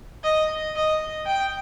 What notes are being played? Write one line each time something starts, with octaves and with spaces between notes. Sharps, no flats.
D#5
D#5
G5